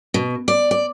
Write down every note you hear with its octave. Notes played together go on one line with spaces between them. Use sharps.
B2
D5
D5